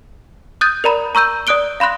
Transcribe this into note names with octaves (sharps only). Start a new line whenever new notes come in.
D#6 F#6 G6 A6 D#7
A#4 D5 A#5 B5
A#5 C#6 E6 G6 D#7
D5 D#6 F#6 D7 G7
F5 B5 C6 F#6 A#6